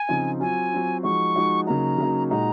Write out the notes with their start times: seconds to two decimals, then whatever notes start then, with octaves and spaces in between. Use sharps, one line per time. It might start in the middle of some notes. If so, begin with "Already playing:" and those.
Already playing: G#5
0.09 C#3 F3 C4 D#4
0.40 F#3 C4 F4 G#5
0.72 F#3 C4 F4
1.03 F3 G#3 D#4 F#4 C#6
1.35 F3 G#3 D#4 F#4
1.67 C#3 F#3 A#3 D#4 A#5
1.98 C#3 F#3 A#3 D#4
2.30 A#2 G#3 D#4 F#4 A#5